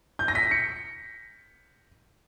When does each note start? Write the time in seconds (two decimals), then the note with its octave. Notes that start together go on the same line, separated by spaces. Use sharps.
0.19 G6
0.28 A#6
0.35 B6
0.51 C#7